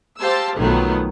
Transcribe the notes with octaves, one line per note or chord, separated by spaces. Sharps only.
G4 C5 F5 A5 E6
B1 D#3 F3 F#3 A3 B3